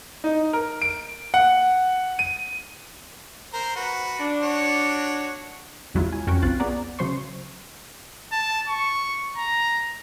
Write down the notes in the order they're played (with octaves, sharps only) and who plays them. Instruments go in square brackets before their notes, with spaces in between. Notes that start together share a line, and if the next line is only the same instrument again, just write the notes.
[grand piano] D#4
A#4
D7
F#5
D#7
[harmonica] A#4 C5
F#4 B4
[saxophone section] D4
[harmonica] F#4 C#5
[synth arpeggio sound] G#1 E2 F#3 G#3 E4 F4
G#5
F2 C#4 F#4 A#4 G5 C#6
B1 C4 F4 F#6 A6
B3 G#4 D5 F#5 A#5
C#3 F#3 C5 C6 C#6
[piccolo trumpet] A5
C#6
A#5